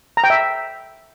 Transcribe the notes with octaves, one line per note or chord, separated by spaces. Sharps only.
A#5
G5
E5